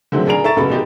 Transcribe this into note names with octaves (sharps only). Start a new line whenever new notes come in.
D3 D#3 F#3 G#3 A3 C4
D2 G#4 A#4 D5 D7 F7
A4 E5 A#5 C#6 A6 E7
A1 F#2 C#3 B3 A4 B5
B2 D#3 G#3 D#4 G4